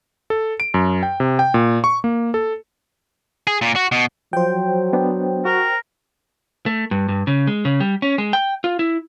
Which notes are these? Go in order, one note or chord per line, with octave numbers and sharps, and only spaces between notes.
A4
D7
F#2
G5
C3
G5
A#2
C#6
A#3
A4
G#4
A#2
F#4
B2
F3 F#3 C5 G5
B3 D4
F#4 A#4
A3
G2
G2
C#3
G#3
C#3
G3
C#4
G#3
G5
F4
E4